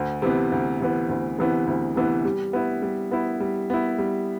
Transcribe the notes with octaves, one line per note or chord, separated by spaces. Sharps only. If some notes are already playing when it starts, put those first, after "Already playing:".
Already playing: D2
C3 E3 B3
D2
C3 E3 B3
D2
C3 E3 B3
D2
C3 E3 B3
G3
B3 E4
G3
B3 E4
G3
B3 E4
G3